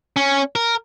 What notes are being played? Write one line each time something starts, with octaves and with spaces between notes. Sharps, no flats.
C#4
A#4